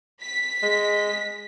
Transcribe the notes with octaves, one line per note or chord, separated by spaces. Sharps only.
B6
G#3